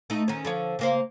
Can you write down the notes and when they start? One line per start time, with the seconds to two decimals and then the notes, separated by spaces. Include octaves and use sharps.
0.10 A3 D#4
0.28 D#3 C#4
0.45 D3 F3 C#5
0.79 C#3 A#3 C5